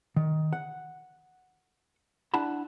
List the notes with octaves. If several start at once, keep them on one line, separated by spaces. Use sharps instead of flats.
D#3
F#5
D4 E4 F#5 A5 B5